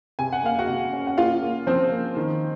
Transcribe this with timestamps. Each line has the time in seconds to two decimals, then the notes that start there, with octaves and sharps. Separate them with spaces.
0.19 C3 G#5
0.33 F#5
0.44 A#3 F5
0.59 F#4 F#5
0.68 C3
0.93 C#4
1.07 F#5
1.18 A#3 F4 F5
1.42 A#3
1.67 F3 C4 C5
1.91 A#3
2.17 D#3